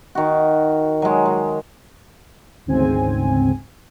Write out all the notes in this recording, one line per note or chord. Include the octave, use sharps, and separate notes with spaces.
D#3 F#4
F#3 G#3
G#3
G#1 D2 G#2 C#3 C4 G#5